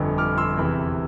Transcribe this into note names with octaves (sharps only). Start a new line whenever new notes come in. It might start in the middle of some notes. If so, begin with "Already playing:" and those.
Already playing: G1 F2 D3
D6 F6
C6 E6
E2 C3 E3